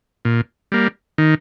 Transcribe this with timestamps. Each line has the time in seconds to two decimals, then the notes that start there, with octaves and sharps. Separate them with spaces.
0.25 A#2
0.72 G3 A#3
1.18 D#3